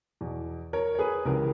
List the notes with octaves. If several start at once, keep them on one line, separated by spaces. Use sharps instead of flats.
E2 B2
A#4 C#5
C#5
G#4 B4
C#2 C#3 E3 G4 A#4